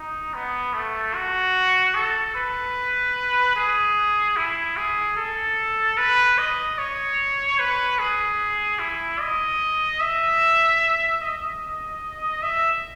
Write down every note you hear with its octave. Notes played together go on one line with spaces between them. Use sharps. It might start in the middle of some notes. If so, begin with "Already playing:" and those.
Already playing: D#4
B3
A3
F#4
A4
B4
G#4
E4
G#4
A4
B4
D#5
C#5
B4
G#4
E4
D#5
E5
D#5
E5